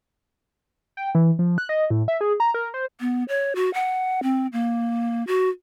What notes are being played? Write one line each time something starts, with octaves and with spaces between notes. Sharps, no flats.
G5
E3
F3
F#6
D#5
A2
E5
G#4
A#5
A#4
C5
B3
C#5
F#4
F#5
C4
A#3
F#4